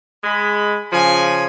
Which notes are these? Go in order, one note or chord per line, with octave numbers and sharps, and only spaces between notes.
G#3 B5
C#3 F3 G#5